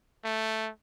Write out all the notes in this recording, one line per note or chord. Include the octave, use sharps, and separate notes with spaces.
A3